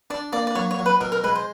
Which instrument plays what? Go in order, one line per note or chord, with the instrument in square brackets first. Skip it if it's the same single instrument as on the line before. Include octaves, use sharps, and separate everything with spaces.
[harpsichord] D4 [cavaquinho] D5
[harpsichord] A#3 [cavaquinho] D5
[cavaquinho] D5
[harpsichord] F#3 [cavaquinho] C#5
[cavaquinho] C#5
[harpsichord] F#3
[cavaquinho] B4
[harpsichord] B2 [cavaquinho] A#4
[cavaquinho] A#4
[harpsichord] G#3 [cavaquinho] B4
[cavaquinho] C5